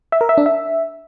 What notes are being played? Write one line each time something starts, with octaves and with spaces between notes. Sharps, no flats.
E5
A#4
E5
D4
E5